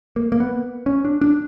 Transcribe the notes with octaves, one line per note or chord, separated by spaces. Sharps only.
A#3
A#3
B3
C#4
D4
D4